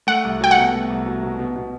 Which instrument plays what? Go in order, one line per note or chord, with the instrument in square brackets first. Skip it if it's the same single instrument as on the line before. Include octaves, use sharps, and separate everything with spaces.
[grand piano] A3 [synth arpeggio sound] F#5
[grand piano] C2
[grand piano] F#3 [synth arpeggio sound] G5
[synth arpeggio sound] F#5
[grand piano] B2
A3
C2
F#3
B2
B2
B2